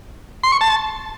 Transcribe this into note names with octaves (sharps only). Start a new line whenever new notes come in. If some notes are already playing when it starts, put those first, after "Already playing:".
C6
C#6
A5